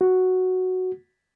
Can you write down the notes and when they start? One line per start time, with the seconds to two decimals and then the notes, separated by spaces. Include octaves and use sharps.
0.01 F#4